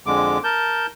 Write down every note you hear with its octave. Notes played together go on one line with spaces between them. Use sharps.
F2 D3 G#3 D6
A#4 A5 G6